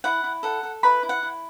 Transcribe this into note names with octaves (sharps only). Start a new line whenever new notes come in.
E4 F#5
E4
A4 F#5
A4
E4 B4 B5
E4
F#5
E4